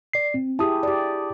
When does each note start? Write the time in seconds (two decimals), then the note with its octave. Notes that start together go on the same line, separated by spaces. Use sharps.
0.13 D5 C7
0.34 C4
0.59 E4 G4 G#4 A5 D#6
0.83 G4 D5